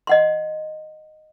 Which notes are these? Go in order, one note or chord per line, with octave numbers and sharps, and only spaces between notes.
D#5 F#5 C6